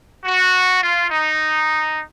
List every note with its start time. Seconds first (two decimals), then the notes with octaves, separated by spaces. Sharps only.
0.24 F#4
0.82 F4
1.10 D#4